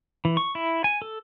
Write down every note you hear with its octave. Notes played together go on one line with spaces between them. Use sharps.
E3
C#6
E4
G#5
A4